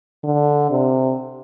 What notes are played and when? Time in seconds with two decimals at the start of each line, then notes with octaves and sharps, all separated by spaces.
0.24 D3
0.71 C3